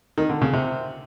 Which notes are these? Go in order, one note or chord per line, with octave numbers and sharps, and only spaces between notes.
D#3
D3
C#3
C3